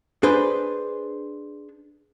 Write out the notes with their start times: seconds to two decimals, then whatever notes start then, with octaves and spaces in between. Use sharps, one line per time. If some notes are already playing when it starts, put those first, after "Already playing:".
0.23 D4 G#4 B4 C5